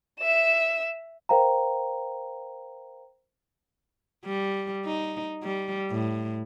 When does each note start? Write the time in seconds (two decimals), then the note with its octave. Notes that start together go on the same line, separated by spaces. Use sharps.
0.20 E5 E7
1.29 A#4 C5 F5 G5 A#5
4.25 G3
4.85 D#4
5.43 G3
5.91 A2